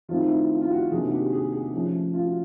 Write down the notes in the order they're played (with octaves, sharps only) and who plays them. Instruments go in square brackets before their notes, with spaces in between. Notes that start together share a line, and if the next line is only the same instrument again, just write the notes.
[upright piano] D#3 F#3 A3 C4 D#4 F4
E4
F4
F4
F#4
C3 D#3 F#3 A#3 D4 G#4
F#4
G4
G#4
G#4
F3 A3 C#4
F4
F#4